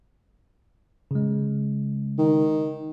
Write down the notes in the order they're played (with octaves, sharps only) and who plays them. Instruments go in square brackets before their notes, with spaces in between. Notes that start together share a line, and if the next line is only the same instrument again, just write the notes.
[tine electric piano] C#3 G#3
[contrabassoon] D#3